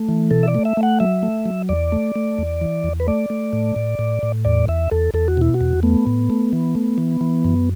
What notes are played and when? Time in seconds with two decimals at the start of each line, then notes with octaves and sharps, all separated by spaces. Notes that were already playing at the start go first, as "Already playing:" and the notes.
Already playing: A3
0.09 E3
0.31 B2 A4
0.43 E5
0.48 D5
0.55 A3
0.65 E5
0.77 A3
0.83 F#5
1.00 F#3 E5
1.23 A3
1.45 F#3
1.69 E2 D5
1.92 A3
2.16 A3
2.38 E2
2.61 E3
2.84 E2
3.00 B4
3.08 A3 D5
3.30 A3
3.53 A2
3.76 A2
3.99 A2
4.23 A2
4.45 E2 D5
4.68 E2 E5
4.91 E2 A4
5.14 E2 A4
5.28 F#4
5.37 B2 E4
5.54 F#4
5.61 E2
5.83 A3 B3
6.07 A2
6.30 A3
6.53 E3
6.75 A3
6.98 E3
7.21 E3
7.45 F#2